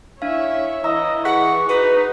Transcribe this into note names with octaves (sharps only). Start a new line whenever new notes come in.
D4 E4 C#5 E5 F5
E3 D#5 A#5 E6
G#4 F#5 C#6 F#6 B6
D#4 F#4 B4